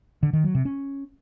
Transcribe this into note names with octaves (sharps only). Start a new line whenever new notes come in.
D3
D#3
F#3
C3
C#4